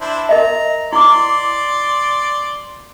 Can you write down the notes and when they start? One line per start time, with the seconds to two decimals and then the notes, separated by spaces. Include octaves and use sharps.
0.01 D4 E4 C5
0.29 A#4 D#5 E5 A#5
0.93 E4 D5 C6 D6